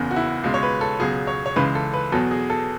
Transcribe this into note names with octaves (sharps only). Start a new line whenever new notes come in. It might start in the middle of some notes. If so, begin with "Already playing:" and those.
Already playing: F#1 E2 C#3
F#4
E4
C#2 B2 G#3
C#5
B4
A4
C#2 B2 F#3 G#4
C#5
C#5
C#2 C#3 E3 G#3 B4
A4
B4
E2 B2 F#3 A4
G#4
A4